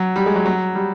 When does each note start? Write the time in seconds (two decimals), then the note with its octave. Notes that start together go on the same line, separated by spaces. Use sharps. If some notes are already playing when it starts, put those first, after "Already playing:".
Already playing: F#3
0.16 G3
0.26 G#3
0.36 F#3
0.46 F#3
0.75 G3